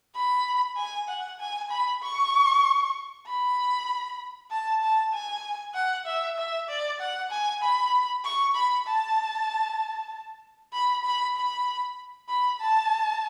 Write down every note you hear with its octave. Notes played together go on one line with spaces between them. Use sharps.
B5
G#5
F#5
G#5
B5
C#6
B5
A5
A5
G#5
F#5
E5
E5
D5
F#5
G#5
B5
C#6
B5
A5
B5
B5
B5
B5
A5